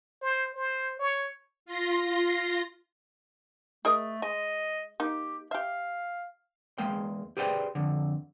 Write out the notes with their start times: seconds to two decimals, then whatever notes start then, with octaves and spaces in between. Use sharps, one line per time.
0.22 C5
0.55 C5
1.00 C#5
1.66 F4 C6 A#6
3.85 A3 G#4 A#4 D#5
4.22 G#3 D#5
5.00 A#3 D#4 G4
5.51 G4 E5 F5
6.78 E2 G#3 A#3 G5
7.37 G4 G#4 B4 C5 D5 G5
7.75 F2 D3